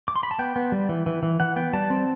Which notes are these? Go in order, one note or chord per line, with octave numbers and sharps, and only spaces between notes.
D6
C6
B5
A5
B3 G5
B3
G3
E3
E3
E3
E3 F#5
B3 G5
G3 A5
C4